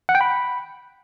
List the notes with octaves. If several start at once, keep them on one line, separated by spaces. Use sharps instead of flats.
F#5
G5
B5